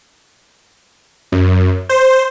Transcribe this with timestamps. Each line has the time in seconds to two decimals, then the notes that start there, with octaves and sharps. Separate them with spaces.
1.32 F#2
1.89 C5